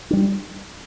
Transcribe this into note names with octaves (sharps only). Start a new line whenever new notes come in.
G3 D4